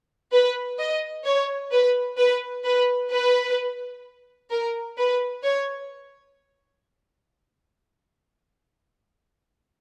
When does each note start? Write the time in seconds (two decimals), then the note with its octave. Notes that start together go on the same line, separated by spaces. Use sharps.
0.32 B4
0.79 D#5
1.25 C#5
1.71 B4
2.18 B4
2.64 B4
3.12 B4
4.51 A#4
4.98 B4
5.44 C#5